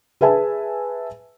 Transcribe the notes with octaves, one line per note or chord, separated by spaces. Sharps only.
G#4 B4 E5 G#5 A5